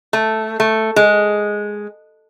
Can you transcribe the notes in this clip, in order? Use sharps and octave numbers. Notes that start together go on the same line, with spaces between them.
A3
A3
G#3